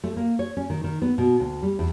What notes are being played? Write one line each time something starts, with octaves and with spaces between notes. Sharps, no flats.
A3
A#3
C#5
C#4
D#3
D#3
B3
B2
D2
G3
E2